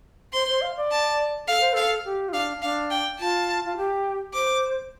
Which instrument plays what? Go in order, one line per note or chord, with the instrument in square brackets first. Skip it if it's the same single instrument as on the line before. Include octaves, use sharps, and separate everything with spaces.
[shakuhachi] C5 [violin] C6
[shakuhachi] C5
F5
D5
[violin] A5
[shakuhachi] A4 [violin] F5
[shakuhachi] C5
[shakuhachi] A4 [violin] F5
[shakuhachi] G4
F4
[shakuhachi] D4 [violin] F5
[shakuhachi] D4 [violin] F5
[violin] G5
[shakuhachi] F4 [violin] A5
[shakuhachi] F4
G4
[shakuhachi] C5 [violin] D6